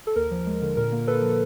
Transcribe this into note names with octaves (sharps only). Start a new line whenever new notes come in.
A4
D#2 A#4
F3
G#3
D3
A#2 A#4
A#3
A#2 A4 B4
F3